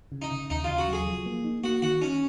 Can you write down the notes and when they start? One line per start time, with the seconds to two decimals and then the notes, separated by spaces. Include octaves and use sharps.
0.12 C#3
0.22 D#4
0.32 C#3
0.50 D#2 D#4
0.64 C#3 F4
0.78 F#4
0.88 F#3 G#4
1.07 F3
1.26 A#3
1.44 D#4
1.64 A#3 F#4
1.82 D#3 F#4
2.01 C#4 D#4